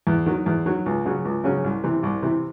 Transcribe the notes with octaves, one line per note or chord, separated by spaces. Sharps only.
E2
D#3 F#3
E2
D#3 F#3
C#2
C#3 F#3 C#4
C#2
C#3 F#3 C#4
C2
C3 E3
C2
C3 E3